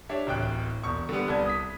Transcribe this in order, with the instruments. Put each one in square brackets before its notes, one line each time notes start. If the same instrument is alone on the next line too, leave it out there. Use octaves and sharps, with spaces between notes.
[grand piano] D4 G4 C#5 E5
D1 A1 G5 F#6
E1 C#6
D3 G3 B3
C2 A5 G#6
D#6 B6